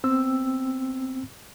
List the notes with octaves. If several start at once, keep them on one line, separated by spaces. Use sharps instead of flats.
B3 C4 E6